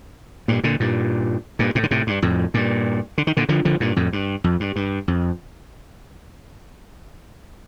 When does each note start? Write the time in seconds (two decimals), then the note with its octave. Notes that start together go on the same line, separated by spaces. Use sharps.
0.48 G2 A#2
0.64 A#2 D3
0.80 G2 A#2
1.59 G2 A#2
1.75 A2 C3
1.83 D3
1.91 A2 C3
2.07 G2
2.22 F2 A2
2.54 G2 A#2
3.18 D3
3.27 D#3
3.37 A#2 D3
3.49 D3 F3
3.65 D3 F3
3.80 G2 A#2
3.96 F2 A2
4.13 G2
4.44 F2
4.60 G2
4.76 G2
5.08 F2